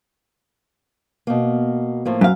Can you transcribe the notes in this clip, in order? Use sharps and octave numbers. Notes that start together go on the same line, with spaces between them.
B2 A#3
A2 F3 A#3
F#2 F5